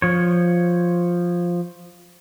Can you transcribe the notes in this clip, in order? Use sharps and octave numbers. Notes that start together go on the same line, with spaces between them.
F3 C#5